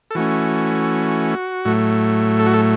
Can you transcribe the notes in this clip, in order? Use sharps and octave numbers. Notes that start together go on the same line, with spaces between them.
A4
E3 A3 C#4 F#4
A2 F#3 A3
A4
F#4
A4